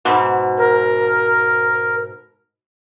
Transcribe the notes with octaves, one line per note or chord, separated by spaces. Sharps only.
G#2 B2
A#4